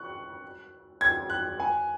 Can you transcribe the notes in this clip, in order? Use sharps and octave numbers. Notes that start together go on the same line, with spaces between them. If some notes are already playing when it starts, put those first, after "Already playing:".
Already playing: C#6 F#6
G#6
F#6
G#5